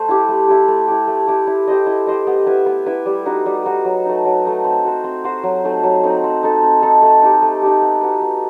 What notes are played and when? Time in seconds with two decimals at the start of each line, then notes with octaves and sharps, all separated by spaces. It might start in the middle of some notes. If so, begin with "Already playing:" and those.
Already playing: A3 C5
0.09 E4 G4
0.29 A3
0.48 E4 G4
0.68 A3
0.88 E4 G4
1.07 A3
1.27 E4 G4
1.47 E4
1.67 G4 C5 D#5
1.87 E4
2.07 G4 C5 D#5
2.27 B3
2.46 E4 B4 E5
2.66 B3
2.86 E4 B4 E5
3.06 G3
3.26 D#4 F#4 B4
3.46 G3
3.65 D#4 F#4 B4
3.85 F#3
4.05 A3 D#4
4.25 F#3
4.45 A3 D#4
4.64 C4
4.85 F#4 C5
5.04 C4
5.24 F#4 C5
5.43 F#3
5.64 A3 C4 D#4
5.83 F#3
6.03 A3 C4 D#4
6.24 C4
6.43 D#4 A4
6.63 C4
6.82 D#4 A4
7.02 A3
7.22 D#4 G4
7.42 A3
7.62 D#4 G4
7.82 B3
8.01 F#4 B4
8.21 B3